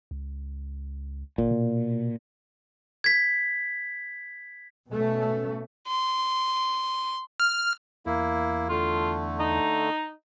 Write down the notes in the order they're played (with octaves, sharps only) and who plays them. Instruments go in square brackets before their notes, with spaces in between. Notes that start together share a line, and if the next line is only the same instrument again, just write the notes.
[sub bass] C#2
[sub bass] G1 [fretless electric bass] A#2
[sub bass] B2
[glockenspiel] G#6 B6
[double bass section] B2 A3 C#4
[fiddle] C6
[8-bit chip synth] F6
[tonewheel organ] E2 [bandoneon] A#3 E4
[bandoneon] D3 A3 [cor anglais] F4
[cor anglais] D#4